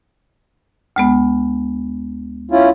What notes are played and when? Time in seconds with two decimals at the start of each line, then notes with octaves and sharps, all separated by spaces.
0.96 D2 G#3 B3
2.51 C#4 E4 F4